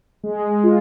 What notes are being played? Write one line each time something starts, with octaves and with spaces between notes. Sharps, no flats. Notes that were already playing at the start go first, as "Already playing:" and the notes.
G#3
F4